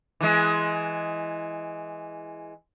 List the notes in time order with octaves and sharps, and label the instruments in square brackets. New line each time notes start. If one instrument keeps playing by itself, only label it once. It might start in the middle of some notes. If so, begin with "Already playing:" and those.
[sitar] E3 G#3